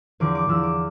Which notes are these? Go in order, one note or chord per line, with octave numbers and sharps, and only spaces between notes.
E2 D3 F3 D6
D6
E2 D3 F3 E6
D6